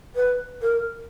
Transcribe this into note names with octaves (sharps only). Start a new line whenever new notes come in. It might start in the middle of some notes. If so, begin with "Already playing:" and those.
B4
A#4